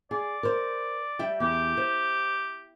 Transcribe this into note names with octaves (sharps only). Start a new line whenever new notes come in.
G#4 D5
A#4 C5
G3 E5 G5
E2 G4
C5